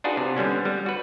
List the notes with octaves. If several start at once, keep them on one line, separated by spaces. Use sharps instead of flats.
D4 D#4 F4 F#4 G#4 B4
C3
D3 G3 B3 C#4
G3
F#4 B4